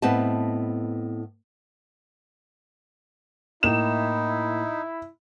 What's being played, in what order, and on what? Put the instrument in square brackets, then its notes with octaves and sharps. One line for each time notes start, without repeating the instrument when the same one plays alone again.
[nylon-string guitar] A2 B3 C4 B4 D#5 A5
[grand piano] A2 A#3 [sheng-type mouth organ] D#4 [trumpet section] E4 [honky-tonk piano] E7